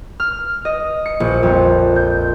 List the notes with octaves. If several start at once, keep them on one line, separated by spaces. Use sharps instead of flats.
F6
D#5
C#7
A#1
F2
G6